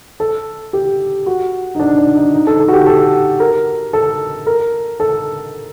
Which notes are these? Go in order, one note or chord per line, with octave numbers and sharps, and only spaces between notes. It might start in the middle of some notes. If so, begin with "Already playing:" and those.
A4
G4
F#4
D#4
D4
D4
D#4
D#4
A4
A4
F#4
G4
A4
A#4
A4
A#4
A4